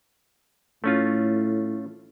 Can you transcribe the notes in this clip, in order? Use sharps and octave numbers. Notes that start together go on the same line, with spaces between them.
A2 A3 C#4 F4